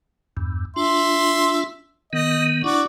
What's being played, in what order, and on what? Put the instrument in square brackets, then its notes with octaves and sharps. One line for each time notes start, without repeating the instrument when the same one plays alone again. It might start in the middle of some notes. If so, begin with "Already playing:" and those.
[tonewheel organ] E2 G2
[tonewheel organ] D4 F4 [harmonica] E5 C6
[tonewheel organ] D#3 B3 [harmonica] D#5
[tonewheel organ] D4 E4 [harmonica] F#4 D5 C#6